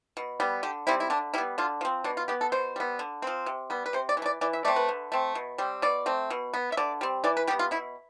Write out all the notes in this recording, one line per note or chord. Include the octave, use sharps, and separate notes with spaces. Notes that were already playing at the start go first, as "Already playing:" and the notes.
B2
G3 B3
D3 G4
G3 C4 E4
E4
D3 D4
G3 B3 E4
D3 F4
F3 C4
B2 D4
F4
B3 G4
A4
B2 C5
G3 B3
D3
F3 C4
C3
G3 B3
B4
C3 C5
D5
E3
A3
D5
E3 D5
E5
A3 C4 D5
B4
D3
A3 C4
B2
G3 C4
B2 D5
A3 C4
B2
B3
E5
D3 D5
G3 C4
E3 D5
B4
G3 B3 G4
F4
B2 E4